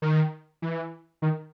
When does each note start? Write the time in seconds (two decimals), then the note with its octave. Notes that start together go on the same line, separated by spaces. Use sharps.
0.02 D#3
0.62 E3
1.22 D#3